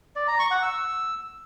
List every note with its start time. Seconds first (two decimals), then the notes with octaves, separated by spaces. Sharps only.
0.16 D5
0.28 A#5
0.39 C#6
0.51 F#5
0.62 E6